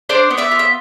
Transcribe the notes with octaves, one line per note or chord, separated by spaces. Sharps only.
D4 C5 D5
B3
D5 E5
F4
E5